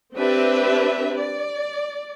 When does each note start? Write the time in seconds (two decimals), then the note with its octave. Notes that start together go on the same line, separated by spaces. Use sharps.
0.15 C4 D4 G4 B4 E5
1.16 D5